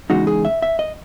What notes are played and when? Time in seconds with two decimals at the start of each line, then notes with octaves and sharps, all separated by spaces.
0.10 E2 C#3 G#3 D#4 F#4
0.27 G#4
0.45 E5
0.62 E5
0.79 D#5